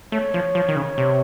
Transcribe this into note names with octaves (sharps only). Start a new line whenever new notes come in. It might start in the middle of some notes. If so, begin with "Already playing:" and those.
A3 C#5
F3
F3
D#3
C#3
C3